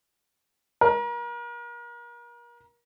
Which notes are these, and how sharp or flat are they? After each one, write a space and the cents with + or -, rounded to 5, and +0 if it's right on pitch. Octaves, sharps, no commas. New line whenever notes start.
A#4 +35